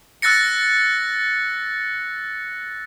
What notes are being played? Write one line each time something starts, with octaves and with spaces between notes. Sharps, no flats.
E6 F#6 A6 A#6 C#7